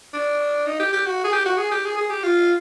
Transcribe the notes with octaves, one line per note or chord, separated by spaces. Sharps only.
D4
D#4
G4
G4
F#4
G#4
G4
F#4
G#4
G4
G#4
G#4
G4
F4